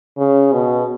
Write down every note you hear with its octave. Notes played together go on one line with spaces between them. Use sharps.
C#3
B2